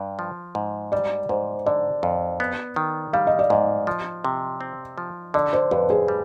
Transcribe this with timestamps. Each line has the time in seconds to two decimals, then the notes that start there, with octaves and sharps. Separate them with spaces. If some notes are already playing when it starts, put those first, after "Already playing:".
Already playing: G2
0.19 F3
0.55 G#2
0.92 G3 D5
1.29 G#2 C5
1.66 D3 D5
2.03 F2
2.40 B3
2.76 D#3
3.13 G3 F5
3.27 D#5
3.39 D5
3.50 G#2 D#5
3.87 F3
4.24 C3
4.61 C4
4.98 F3
5.34 D3 D5
5.53 C5
5.71 F2 B4
5.90 G#4
6.08 G3